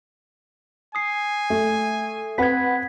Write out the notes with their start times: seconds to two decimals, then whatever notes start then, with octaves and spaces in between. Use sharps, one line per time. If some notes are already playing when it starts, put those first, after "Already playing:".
0.95 G#5 D#6 C7
1.50 A3
2.38 C4 B4 F#5 G#6 B6